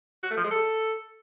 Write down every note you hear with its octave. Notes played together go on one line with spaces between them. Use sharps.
F#4
A3
F3
G#3
A4